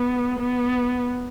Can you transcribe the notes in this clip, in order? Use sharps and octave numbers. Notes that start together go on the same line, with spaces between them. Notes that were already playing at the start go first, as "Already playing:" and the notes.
Already playing: B3
B3